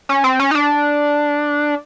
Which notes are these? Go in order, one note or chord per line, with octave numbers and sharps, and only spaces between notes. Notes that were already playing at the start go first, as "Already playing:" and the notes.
C#4
C4
C#4
D#4
D4